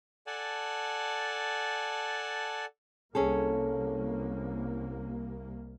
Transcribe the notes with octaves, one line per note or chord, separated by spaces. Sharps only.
A4 D5 F#5 G#5 A5
C2 A#3 C#4 G#4 A4